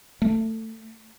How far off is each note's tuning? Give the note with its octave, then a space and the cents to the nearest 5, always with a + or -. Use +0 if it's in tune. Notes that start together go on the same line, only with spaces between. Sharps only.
A3 +20